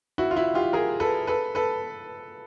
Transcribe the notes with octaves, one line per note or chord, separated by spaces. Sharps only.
E4 F#4
F4
E4 F#4
F4 G4
G#4 A#4
A4 B4
A4 B4
A4 B4